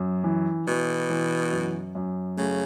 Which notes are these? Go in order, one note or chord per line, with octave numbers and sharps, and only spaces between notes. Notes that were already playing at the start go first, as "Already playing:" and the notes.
Already playing: F#2
E3
B2 E3
E3
F#2
F#2
C#3 A3